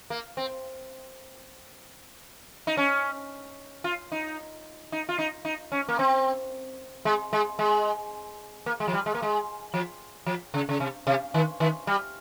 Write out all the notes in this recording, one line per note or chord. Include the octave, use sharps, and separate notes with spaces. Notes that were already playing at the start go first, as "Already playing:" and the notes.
A#3
C4
D#4
C#4
F4
D#4
D#4
F4
D#4
D#4
C#4
A#3
C4
G#3
G#3
G#3
A#3
G#3
F3
G3
G#3
A#3
G#3
F3
F3
C#3
C#3
C3
C3
D#3
D#3
G3